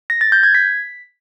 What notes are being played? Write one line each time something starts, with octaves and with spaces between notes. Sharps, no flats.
A#6
A6
G6
G#6
B6